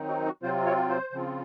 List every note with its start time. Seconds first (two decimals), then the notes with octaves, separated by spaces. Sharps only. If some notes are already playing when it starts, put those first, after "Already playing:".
Already playing: D#3 F#3 C4 D#4
0.09 F#4
0.26 F#4
0.43 C3 F#3 C4 F4 C5
0.66 C#5
0.89 C5
1.12 C#3 F3 C4 F4